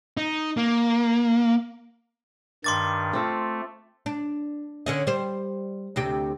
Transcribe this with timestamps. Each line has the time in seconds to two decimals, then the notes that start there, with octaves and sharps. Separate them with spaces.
0.17 D#4
0.57 A#3
2.64 G2 D#3 C6 D6 A6
3.13 A3 C4 F4 A4
4.06 D4
4.86 D3 C#4 D#5
5.07 G3 C5
5.96 D2 C3 G4